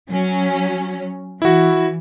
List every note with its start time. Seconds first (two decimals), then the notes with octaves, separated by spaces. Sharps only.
0.10 F#3 C#4
1.42 E3 E4 F#4